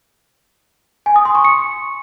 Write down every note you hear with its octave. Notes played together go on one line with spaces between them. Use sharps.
G#5
D#6
C6
C#6
C#7